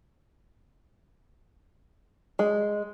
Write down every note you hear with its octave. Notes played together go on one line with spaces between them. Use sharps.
G#3